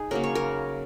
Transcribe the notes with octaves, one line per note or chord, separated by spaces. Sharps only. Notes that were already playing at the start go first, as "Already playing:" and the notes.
Already playing: D#4 G#4
C#3 F#3 A#3 A#4
C#5
A#4